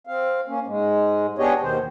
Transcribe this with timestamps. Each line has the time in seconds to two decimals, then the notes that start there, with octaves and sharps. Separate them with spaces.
0.07 C4 F5
0.48 A#3 C#4
0.67 G#2 G#3
1.38 B3 D4 G4 G#4 C#5 D#5
1.62 D#2 B2 D#3 C5